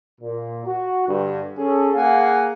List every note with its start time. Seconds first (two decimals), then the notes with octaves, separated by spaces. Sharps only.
0.21 A#2
0.66 F#4
1.08 G2 D3
1.58 C#4 G#4 A4
1.95 A#3 G#4 F5 F#5 G#5